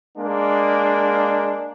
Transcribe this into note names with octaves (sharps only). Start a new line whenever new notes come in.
G#3 A#3 D4